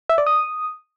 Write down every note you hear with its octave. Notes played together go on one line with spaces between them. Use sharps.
E5
D5
D#6